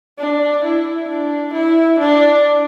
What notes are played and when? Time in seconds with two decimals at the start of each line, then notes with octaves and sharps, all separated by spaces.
0.18 D4
0.64 E4
1.09 D4
1.54 E4
1.99 D4